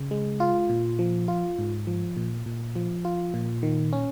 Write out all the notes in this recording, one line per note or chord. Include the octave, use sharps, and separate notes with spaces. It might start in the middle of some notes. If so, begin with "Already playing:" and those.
Already playing: C#3
G#3
F4
A#2
F3
F4
G#2
F3
A#2
A#2
F3
F4
A#2
D#3
C#4